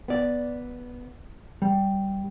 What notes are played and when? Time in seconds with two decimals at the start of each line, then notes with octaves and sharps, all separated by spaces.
0.08 B3 D5
1.62 G3